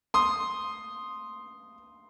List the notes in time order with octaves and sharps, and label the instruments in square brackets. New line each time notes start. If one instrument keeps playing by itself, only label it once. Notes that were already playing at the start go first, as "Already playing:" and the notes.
[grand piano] C6 D#6